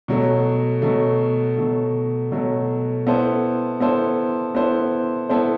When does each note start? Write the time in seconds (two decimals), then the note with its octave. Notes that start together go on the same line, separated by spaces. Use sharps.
0.08 B2 F#3 A3
0.82 B2 F#3 A3
1.57 B2 F#3 A3
2.32 B2 F#3 A3
3.07 B3 E4 A4 C5
3.80 B3 E4 A4 C5
4.55 B3 E4 A4 C5
5.29 B3 E4 A4 C5